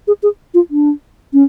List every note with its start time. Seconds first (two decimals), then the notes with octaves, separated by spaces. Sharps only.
0.08 G#4
0.23 G#4
0.54 F4
0.71 D4
1.33 C#4